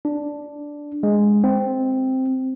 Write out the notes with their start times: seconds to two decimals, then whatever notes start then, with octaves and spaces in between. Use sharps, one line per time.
0.05 D4
1.03 G#3
1.44 C4